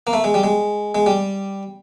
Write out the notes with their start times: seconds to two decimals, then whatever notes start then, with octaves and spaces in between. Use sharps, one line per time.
0.07 A#3
0.13 A3
0.24 G#3
0.34 G3
0.44 G#3
0.95 G#3
1.06 G3